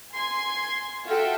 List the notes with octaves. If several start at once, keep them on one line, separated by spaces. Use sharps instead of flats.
G#5 C6 G#6
F4 F#4 A4 E5 G5